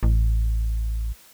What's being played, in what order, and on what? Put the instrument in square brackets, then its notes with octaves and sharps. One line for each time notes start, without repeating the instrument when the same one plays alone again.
[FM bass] A1